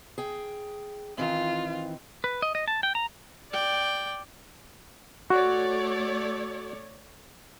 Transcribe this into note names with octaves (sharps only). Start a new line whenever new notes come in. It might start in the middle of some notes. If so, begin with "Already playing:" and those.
G#4 G5
D#3 E3 C4 F4
B4
D#5
D#5
A5
G5
A#5
D5 G5
A3 F#4 C#5 D5